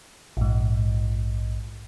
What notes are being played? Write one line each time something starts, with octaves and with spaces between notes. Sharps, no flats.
A#1 G#2